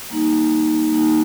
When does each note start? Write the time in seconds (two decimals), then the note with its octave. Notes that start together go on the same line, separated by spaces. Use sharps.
0.10 G3 A#3 D#4
0.90 G3 A#3 D#4